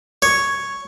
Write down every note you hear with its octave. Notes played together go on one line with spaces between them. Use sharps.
C#5